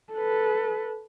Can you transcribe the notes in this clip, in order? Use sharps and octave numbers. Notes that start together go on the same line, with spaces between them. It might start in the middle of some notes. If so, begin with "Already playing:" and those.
A4 B4